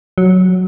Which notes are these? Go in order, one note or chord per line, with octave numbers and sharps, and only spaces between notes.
F#3